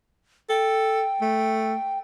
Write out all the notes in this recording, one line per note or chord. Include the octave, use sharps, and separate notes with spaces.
A4 G5
A3